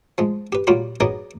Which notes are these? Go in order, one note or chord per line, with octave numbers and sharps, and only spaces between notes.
F3 G#3
G4 B4
A#2 F#3 G3 F4 G4 B5
F#3 B3 D#4 G#4 D5 D#5